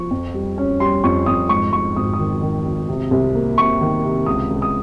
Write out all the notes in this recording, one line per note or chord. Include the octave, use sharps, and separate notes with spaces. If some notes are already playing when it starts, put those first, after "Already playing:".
Already playing: F3 C#6
F2
G3
C#4
G3 C6
F2 C#6
F2 D#6
G#2 C#6
G#2 C#6
G#1 D#6
D#6
D#3
D#3
G#1
C3
C2
A#3
C3 C#6
D#3
C3
C#2 D#6
C#2
D#6